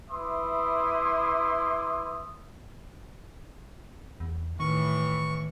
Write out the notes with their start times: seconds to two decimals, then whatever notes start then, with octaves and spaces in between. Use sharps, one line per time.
0.11 E4 B4 E5 C6 D6 D#6
4.20 E2
4.60 A2 D#3 E3 C#6